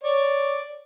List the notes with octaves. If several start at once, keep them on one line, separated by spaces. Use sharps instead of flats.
C#5 D5